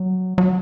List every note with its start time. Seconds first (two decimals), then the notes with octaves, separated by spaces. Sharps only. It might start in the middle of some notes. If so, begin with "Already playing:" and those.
Already playing: F#3
0.38 F#3